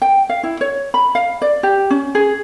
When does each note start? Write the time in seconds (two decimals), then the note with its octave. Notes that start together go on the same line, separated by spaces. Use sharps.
0.02 G5
0.30 F5
0.43 E4
0.61 C#5
0.94 B5
1.15 F5
1.42 D5
1.63 G4
1.90 C#4
2.15 G#4